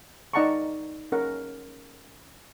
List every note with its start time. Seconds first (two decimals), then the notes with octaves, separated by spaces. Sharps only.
0.34 D#4 D5 F#5 A5 A#5 C#6
1.12 C#4 A#4 F#5